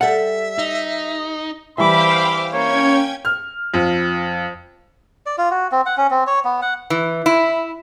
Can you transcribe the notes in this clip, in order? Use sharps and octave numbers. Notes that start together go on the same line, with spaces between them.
G3 A4 E5 F#5
D#4
E3 G3 C5 E5 F5 G5 B5 D6
A#3 C#4 C#5 G5 G#6
F6
F2
D5
F4
F#4
C4
F#5
C#4
C4
C#5
B3
F#5
E3
E4